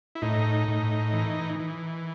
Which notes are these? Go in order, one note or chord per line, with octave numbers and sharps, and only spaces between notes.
E4
A2 D#4
A2
E3
E3